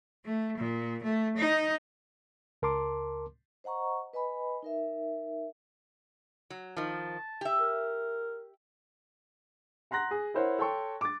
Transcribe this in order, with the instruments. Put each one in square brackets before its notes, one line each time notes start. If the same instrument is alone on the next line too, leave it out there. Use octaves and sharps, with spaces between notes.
[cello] A3
A#2
A3
D#4
[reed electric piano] C#2 A#4 A5 C6 D6
[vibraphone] C5 D#5 F#5 A#5 C#6
B4 D#5 G#5 B5
D#4 A#4 E5
[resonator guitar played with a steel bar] F#3
[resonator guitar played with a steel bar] D#3 F3 [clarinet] A5
[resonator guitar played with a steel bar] G4 E5
[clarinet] A#4
[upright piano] F#5 A#5 C6 F#6 A#6
G#4
E4 A#4 C5 C#5 F#5
A4 C#5 G5 A5 C6 C#6
D6 A6